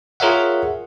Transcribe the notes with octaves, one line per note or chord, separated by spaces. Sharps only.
F4 G#4 A#4 C#5 E5 F#5